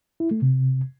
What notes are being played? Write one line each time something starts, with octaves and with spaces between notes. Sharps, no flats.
E4
A3
C3